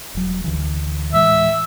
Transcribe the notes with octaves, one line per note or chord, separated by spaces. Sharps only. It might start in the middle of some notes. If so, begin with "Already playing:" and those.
E1 F#3
D2 D3 E3
A2 E3 G#3 E5